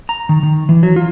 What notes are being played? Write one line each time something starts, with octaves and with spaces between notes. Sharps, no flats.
A#5
D#3
D#3
E3
F#3
F4